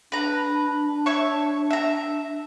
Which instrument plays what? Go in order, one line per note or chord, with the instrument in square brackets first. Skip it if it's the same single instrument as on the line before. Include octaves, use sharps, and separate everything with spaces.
[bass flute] D4 [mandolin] B4 A#5
[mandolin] C#5 E5 C#6
E5 A#5